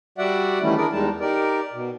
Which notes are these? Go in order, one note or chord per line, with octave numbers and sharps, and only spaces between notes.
G3 F#4 D5 E5 F#5
D#3 E3 G3 A3 C#4 E4
D4 E4 G#4 A#4 D5
E2 G3 G#3 D#4 A5
D#4 G4 A#4 D5
B2